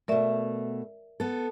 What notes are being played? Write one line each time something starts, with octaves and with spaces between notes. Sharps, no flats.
B2 A3 A#4 D5 E5
B3 A4